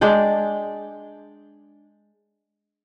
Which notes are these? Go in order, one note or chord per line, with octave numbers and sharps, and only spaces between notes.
G#3 D4 D5 G5